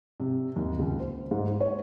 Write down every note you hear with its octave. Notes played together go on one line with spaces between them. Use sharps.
C3
D#2
C#2
C5
G#2
C5
C#5